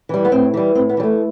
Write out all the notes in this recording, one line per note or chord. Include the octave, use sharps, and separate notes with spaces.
E3 G3
B3
A2 C4
E3 G3
A2 C4
B3
E3 G3
A3